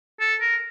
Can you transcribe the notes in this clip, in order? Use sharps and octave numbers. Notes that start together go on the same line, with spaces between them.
A4
A#4